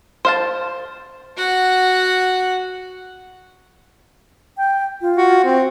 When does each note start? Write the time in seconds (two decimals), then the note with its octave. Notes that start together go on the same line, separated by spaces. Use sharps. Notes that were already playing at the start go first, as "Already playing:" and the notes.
0.25 C5 F5 A5
1.38 F#4 F#5
4.57 G5
5.01 F4
5.17 F#4
5.44 C4